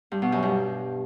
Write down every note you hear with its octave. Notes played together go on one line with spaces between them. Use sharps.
G2
B2
F#2
G2